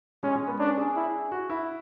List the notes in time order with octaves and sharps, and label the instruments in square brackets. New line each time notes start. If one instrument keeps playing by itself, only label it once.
[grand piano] G#3 [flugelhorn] C#4
[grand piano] G#3
B3
[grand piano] C#4 [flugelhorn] D4
[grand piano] G#4
[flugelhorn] E4
[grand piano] F#4
E4